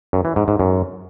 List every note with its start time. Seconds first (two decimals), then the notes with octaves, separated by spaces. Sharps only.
0.13 F#2
0.25 E3
0.36 G#2
0.48 G#2
0.60 F#2